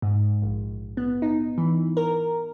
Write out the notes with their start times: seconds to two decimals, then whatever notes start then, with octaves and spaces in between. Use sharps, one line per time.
0.02 G#2
0.42 A#1
0.97 B3
1.22 D#4
1.58 E3
1.97 A#4